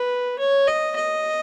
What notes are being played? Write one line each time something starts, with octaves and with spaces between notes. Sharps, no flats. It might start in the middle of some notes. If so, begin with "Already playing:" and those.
Already playing: B4
C#5
D#5
D#5